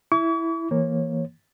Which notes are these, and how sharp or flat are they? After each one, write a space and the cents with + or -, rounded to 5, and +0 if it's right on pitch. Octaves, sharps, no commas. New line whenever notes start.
E4 +0 C#6 +45
E3 +0 A#3 +0 C#5 -25